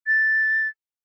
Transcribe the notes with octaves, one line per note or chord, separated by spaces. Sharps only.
A6